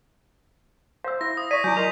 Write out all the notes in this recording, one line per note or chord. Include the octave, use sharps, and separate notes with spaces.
C5 F5 E6
E4 A#6
D#6
D5 C#6 B6 D#7
F#3 E4 G#5 D6 G6
A#4 D#5 C6 F7